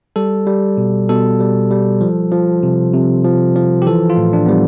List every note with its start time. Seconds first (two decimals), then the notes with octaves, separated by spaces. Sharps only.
0.16 G3 A4
0.47 G3
0.77 B2
1.09 B2 A4
1.40 G3
1.71 G3
2.01 F3
2.32 F3
2.63 C3
2.94 C3
3.24 F3
3.56 F3
3.82 G4
3.86 E3 A4
4.10 F4
4.17 A2
4.33 D4
4.46 G3 B3